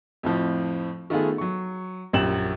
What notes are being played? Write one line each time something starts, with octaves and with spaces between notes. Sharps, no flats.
F2 A2 F3
D#3 A3 B3 F4 G#4
F#3 C#6
A#1 F#2 G4 E7 F#7